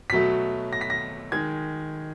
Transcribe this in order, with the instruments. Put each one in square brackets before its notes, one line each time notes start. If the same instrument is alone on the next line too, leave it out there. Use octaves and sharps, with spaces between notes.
[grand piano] B2 F#3 A3 B6
A#6
B6
A#6
D#3 G#3 G#6